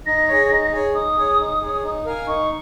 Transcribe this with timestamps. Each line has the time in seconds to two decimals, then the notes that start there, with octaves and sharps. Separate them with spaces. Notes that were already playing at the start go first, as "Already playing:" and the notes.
0.06 D#4 A#6
0.28 G#4 C#5
0.50 D#4
0.72 G#4 C#5
0.94 D#4 D#6
1.17 G#4 C#5
1.39 D#4
1.61 G#4 C#5
1.83 D#4
2.05 A#4 F5 G#5
2.27 D#4 C#6